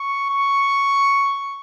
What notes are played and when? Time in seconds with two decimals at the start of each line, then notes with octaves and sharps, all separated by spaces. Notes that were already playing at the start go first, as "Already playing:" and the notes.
Already playing: C#6
0.29 C#6